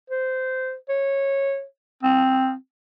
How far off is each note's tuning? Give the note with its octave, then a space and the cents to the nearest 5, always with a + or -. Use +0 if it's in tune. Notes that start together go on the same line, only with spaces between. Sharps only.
C5 -15
C#5 -15
C4 +0